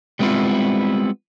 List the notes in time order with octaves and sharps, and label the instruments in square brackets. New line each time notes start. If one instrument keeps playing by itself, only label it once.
[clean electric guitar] G3 G#3 B3 C4 E4 F4